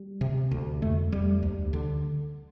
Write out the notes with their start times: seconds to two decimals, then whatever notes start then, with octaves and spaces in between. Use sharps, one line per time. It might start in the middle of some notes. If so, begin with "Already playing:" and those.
Already playing: G3
0.21 C3
0.51 D2
0.82 F2 A3
1.12 F2 G3
1.42 D2
1.73 D3